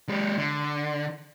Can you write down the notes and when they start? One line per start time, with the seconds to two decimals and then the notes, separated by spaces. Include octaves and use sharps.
0.09 G#3 G4
0.37 D3